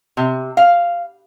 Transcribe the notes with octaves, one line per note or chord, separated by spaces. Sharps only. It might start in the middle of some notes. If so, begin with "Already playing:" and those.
C3
F5